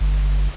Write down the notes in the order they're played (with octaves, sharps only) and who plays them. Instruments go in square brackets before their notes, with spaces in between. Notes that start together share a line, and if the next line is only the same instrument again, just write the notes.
[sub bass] G1